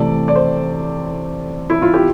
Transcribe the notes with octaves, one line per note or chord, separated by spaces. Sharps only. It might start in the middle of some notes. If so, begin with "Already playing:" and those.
Already playing: C3 E3 A3 C4 D5
D5
C5
E4
F4
G4